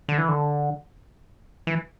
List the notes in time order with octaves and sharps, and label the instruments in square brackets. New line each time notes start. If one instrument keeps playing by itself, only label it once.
[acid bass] D3
E3
D3
E3